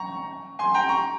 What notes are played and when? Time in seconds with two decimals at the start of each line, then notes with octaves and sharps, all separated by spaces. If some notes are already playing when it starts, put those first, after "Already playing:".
Already playing: A#5 C#6
0.59 G#5 C6
0.74 G5 A#5
0.89 A#5 C#6